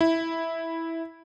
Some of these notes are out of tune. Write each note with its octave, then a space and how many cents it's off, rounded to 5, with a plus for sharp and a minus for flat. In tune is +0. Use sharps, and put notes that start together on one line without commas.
E4 -10